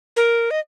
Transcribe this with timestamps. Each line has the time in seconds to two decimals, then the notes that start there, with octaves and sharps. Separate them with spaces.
0.17 A#4
0.51 D#5